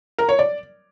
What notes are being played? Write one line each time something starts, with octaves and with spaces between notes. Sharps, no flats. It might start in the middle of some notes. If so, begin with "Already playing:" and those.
A#4
C#5
D5